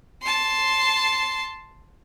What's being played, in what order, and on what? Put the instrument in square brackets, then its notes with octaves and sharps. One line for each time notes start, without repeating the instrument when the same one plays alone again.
[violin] A5 C6